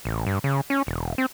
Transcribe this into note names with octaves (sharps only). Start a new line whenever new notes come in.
A1
G2
C#3
C#4
E1
C4